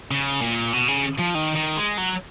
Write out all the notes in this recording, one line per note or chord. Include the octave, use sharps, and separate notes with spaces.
C#3
A#2
B2
C#3
F3
D#3
D#3
G#3
F#3